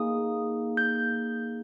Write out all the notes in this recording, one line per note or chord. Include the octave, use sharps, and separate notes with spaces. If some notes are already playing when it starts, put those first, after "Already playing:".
Already playing: A#3 D#4 G#4 D#6
G6